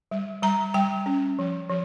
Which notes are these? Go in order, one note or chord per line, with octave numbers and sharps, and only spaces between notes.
G3
G3 A#5
G3 G5
C#4
F3
F3